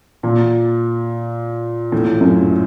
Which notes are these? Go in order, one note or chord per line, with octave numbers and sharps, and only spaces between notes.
A#2
A2
F#2